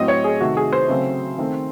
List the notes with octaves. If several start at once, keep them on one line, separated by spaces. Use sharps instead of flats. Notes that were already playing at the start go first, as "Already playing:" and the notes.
Already playing: A2 F#3 C4 D#5
C#5
G#4
C3 D#3 A3 F#4
G#4
C5
C#3 F#3 A3 C4
D#3 A3 C4